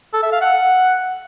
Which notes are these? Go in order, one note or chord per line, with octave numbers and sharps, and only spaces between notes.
A4
E5
F5
F#5